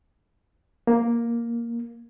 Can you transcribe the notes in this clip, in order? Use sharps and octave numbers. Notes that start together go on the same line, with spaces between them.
A#3